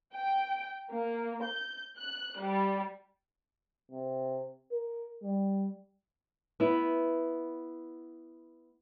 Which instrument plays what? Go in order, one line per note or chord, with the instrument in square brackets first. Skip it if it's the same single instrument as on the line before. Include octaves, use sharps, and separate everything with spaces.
[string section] G5
A#3
G6
F#6
G3
[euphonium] C3
A#4
G3
[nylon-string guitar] B3 E4